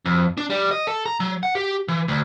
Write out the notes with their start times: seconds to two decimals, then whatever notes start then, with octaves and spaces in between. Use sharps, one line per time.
0.06 F2
0.38 D4
0.50 G3
0.71 D#5
0.87 A4
1.06 A#5
1.20 F#3
1.43 F#5
1.55 G4
1.88 E3
2.08 D2